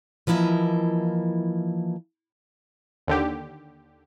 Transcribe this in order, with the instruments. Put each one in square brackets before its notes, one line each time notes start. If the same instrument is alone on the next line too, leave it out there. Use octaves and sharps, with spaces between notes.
[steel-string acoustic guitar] E3 F3 A#3 E4 D#5
[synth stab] D#2 D3 G4